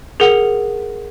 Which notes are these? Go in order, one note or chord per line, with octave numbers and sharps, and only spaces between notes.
G#4 A#4 F#5